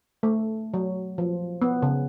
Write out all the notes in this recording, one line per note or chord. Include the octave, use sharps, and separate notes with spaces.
A3
F#3
F3
B3
C#3